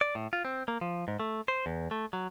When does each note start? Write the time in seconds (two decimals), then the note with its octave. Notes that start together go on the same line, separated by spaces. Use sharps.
0.01 D5
0.15 A2
0.33 F4
0.45 C4
0.68 A#3
0.81 F3
1.08 G#2
1.20 A3
1.48 C5
1.66 E2
1.91 A3
2.13 F#3